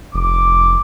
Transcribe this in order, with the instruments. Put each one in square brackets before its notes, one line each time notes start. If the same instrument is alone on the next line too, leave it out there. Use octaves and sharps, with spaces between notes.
[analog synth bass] F1 [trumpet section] D6